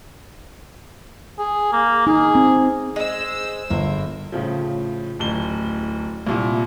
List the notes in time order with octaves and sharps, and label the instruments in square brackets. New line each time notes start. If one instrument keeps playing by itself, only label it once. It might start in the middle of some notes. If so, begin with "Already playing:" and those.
[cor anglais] G#4
A#3
[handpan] D#4 [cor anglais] G#4
[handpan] C4
[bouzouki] G#3 [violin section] C5 E6
[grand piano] G1 [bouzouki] A#3
[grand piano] A2 C#3 F3
D1 A1 G7
C2 A#2 E4